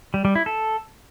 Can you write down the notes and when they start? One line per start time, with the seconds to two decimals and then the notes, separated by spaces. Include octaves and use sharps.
0.14 G3
0.25 G3
0.35 E4
0.46 A4